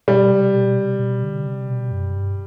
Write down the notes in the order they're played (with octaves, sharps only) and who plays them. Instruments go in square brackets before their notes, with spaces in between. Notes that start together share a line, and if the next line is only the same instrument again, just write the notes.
[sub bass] B2 [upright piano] G3
[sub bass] C3
B2
C3
B2
D3
C3
B2
F#2
G2